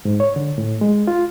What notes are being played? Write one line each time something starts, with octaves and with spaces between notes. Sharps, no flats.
G#2
C#5
D3
A2
G#3
F4